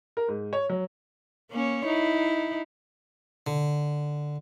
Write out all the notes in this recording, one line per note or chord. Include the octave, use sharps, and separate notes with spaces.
A#4
G#2
C#5
F#3
A#3 C#4 C#5
D#4 E4
D3